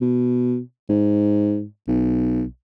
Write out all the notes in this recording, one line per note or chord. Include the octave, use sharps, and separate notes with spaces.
B2
G#2
B1